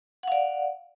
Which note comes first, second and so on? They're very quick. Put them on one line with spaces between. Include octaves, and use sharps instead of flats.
F#5 F5 D5